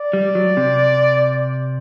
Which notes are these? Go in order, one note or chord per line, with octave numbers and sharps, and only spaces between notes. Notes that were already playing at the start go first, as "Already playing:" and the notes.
Already playing: D5
G3
F#3
C3